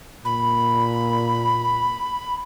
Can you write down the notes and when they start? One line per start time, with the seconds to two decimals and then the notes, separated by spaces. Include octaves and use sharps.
0.25 A#2 B5